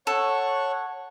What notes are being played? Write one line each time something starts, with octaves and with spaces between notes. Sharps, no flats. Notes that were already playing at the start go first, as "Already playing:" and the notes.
A4 C#5 F#5 C#6